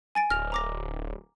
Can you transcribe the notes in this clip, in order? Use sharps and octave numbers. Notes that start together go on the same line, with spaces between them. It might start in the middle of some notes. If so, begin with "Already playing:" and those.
G#5 A6 D7
D1 F6 A#6 F7
A#5 D6 A#6